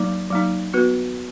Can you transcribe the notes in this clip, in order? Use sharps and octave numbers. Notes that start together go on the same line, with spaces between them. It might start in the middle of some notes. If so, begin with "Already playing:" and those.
Already playing: F#3 A#3 D#4
F#3 A#3 D#4
B3 F#4 B4